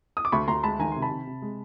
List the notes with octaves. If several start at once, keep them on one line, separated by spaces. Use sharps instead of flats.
D#6
D6
D2 B5 C#6
D2 A#5 C6
G#3 A5 B5
D#3 G#5 A#5
C3 C6
A5 B5
C3
C3
G#3